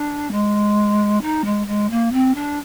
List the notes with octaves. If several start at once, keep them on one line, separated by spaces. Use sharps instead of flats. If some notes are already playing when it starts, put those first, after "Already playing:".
Already playing: D4
G#3
D#4
G#3
G#3
A#3
C4
D4